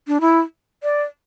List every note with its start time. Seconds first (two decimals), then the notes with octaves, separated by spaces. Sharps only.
0.08 D4
0.21 E4
0.83 D5